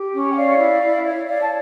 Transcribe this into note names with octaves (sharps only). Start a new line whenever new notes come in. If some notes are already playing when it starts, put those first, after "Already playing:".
Already playing: G4
C#4
G5
C#5 D5 F5
E4
E4
C#5
C#5 D5 F5
A5